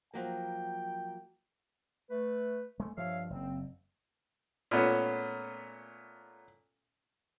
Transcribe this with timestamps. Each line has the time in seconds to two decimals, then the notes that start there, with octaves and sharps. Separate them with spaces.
0.14 F3 F#3 A#3 G5
2.10 A3 B4
2.80 G#3 A3
2.97 G2 F3 C#5 E5 F5
3.30 F#1 C4
4.71 A#2 A3 B3 C#4